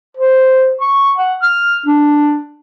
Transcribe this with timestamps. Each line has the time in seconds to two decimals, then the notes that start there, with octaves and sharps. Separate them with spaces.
0.17 C5
0.81 C#6
1.17 F#5
1.42 F6
1.86 D4